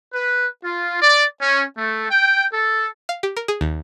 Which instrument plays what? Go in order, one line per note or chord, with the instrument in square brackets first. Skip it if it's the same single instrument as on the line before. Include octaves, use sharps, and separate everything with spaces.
[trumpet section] B4
F4
D5
C#4
A3
G5
A4
[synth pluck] F5
G4
A#4
G#4
D#2